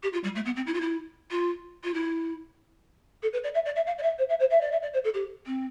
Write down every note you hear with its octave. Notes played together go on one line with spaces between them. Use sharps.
G4
F4
G3
A3
B3
C4
E4
F4
E4
F4
F4
E4
A4
B4
D5
E5
D5
E5
F5
D5
E5
C5
E5
C5
E5
D5
E5
D5
C5
A4
G4
C4